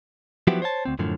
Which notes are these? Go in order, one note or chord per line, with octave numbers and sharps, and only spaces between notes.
F3 F#3 B3 E4 F#4 G4
C5 C#5 E5 A5
D2 C4
F#2 A2 D3 F3